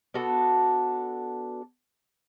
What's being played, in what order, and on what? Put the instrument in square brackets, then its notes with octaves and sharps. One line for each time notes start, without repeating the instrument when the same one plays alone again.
[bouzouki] B3 D4 F#4 A4